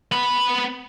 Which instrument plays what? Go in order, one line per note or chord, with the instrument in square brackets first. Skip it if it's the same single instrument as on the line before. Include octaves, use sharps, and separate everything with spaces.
[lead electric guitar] B3 B5